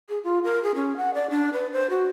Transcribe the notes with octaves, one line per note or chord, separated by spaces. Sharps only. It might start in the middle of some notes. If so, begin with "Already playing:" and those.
G#4
F4
A#4
G#4
C#4
F#5
D5
D4
B4
C5
F#4